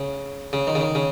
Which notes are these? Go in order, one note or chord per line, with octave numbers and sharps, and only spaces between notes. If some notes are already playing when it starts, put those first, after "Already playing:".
Already playing: C#3
C#3
D#3
C#3
D#3
C#3